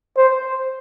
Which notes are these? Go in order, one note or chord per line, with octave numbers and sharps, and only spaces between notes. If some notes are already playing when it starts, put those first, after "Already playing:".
C5